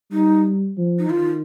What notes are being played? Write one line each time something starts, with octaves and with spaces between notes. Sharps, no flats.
G3 D#4
F3
D#4
D#3 F4